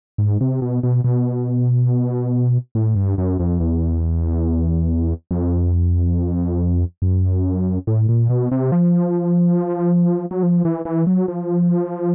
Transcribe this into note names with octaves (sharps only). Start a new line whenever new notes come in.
G#2
C3
B2
B2
B2
A2
G2
F#2
F2
E2
F2
F#2
A2
A#2
B2
C3
F3
F#3
F3
E3
E3
F#3
F3